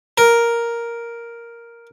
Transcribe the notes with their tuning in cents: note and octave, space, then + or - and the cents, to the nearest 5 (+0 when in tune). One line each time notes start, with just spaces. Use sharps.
A#4 +5